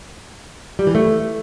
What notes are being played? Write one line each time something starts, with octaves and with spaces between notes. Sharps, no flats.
G3
E3
A3